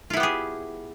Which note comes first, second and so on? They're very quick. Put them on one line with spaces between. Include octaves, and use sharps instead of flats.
F4 E4 B3 G4 G#4